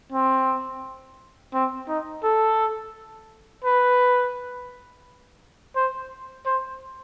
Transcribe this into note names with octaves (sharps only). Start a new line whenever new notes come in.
C4
C4
D#4
A4
B4
C5
C5